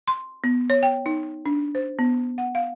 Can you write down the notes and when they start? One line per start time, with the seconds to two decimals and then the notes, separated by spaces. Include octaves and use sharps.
0.08 C6
0.44 B3
0.70 C#5
0.83 G5
1.06 D#4
1.46 D4
1.75 C5
1.99 B3
2.38 F#5
2.55 F5